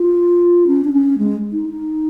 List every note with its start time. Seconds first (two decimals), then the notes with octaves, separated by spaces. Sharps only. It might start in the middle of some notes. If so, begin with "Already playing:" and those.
Already playing: F4
0.67 C#4
0.84 D4
0.93 C#4
1.18 G#3
1.52 D#4
1.70 D#4